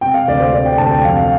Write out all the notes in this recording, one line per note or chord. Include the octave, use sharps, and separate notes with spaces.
C3 G5
F5
D2 D5
C5
C3 D5
G5
D2 A5
G5
F2 F5
F5